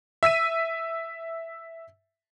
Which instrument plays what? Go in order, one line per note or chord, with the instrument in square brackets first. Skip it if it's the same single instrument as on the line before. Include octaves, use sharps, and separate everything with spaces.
[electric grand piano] E5 E6 B6 D#7